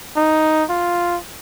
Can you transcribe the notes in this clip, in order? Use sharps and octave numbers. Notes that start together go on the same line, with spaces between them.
D#4
F4